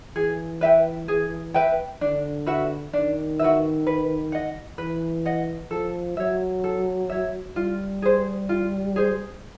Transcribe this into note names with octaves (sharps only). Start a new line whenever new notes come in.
E3 G#4
B4 E5 G5
G#4
B4 E5 G5
D3 D4
F#4 B4 E5
D#3 D4
F#4 B4 E5
B4
D#5 F#5
E3 B4
D#5 F#5
F3 A4
F#3 C#5 E5
A4
C#5 E5
G3 F4
G#4 C5
F4
G#4 C5